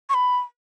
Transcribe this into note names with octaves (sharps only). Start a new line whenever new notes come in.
C#6
B5